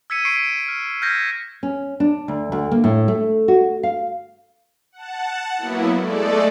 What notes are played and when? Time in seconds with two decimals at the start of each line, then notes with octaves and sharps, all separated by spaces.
0.10 E6 G#6 B6 C#7 D#7
0.25 C#6 B6 C7 D7
0.68 F6
1.02 F6 G6 G#6 A#6 B6
1.63 C#4
2.00 D4
2.28 D2
2.52 D2
2.72 A#3
2.84 A2
3.08 A3
3.48 F#4
3.83 F5
4.92 F#5 A5
5.58 F#3 A#3 B3 E4
5.97 G#3 A3 A4 D5